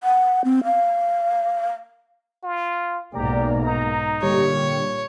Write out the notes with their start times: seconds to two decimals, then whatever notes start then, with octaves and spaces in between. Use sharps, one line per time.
0.04 F#5
0.45 C4
0.64 F5
2.44 F4
3.13 B1 G#2 A#3 G4 D5 A#5
3.64 D#4 A#5
4.22 A#2 D3 G3 G4 C#5